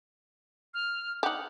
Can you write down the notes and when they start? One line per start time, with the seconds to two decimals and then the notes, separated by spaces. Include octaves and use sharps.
0.74 F6
1.23 D#4 G4 F#5